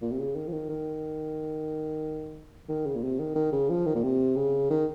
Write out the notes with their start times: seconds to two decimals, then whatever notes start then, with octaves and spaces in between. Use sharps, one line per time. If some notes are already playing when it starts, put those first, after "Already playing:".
0.02 A#2
0.11 C3
0.19 C#3
0.35 D#3
0.47 F3
0.52 D#3
0.69 D#3
2.69 D#3
2.86 C#3
2.95 A#2
3.03 C3
3.19 D#3
3.36 D#3
3.52 C#3
3.70 F3
3.86 D#3
3.95 A#2
4.03 C3
4.36 C#3
4.70 D#3